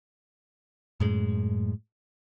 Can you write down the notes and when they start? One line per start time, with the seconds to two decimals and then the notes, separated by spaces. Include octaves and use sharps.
1.00 F#2 A2 G#3